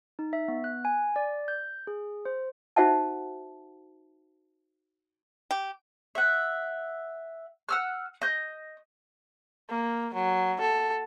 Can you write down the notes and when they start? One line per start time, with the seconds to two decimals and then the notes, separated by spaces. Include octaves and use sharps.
0.19 D#4
0.33 E5
0.48 B3
0.64 F#6
0.85 G#5
1.16 D5
1.48 G6
1.87 G#4
2.25 C5
2.76 D#4 F#4 C5 E5 F#5 A5
5.51 G4
6.15 E5 F#5
7.69 F#5 E6 F6
8.22 D#5 G6
9.70 A#3
10.14 F#3
10.60 A4